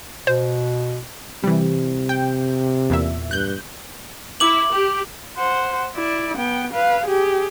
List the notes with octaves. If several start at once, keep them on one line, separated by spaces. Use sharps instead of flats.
B2 C5
C3 E3 G3
G5
E2 A#2 E5
G2 F#6 G6
E4 D6 F#7
G4
C5 F#5
E4 D5
B3 G5
B4 F5
G4 G#4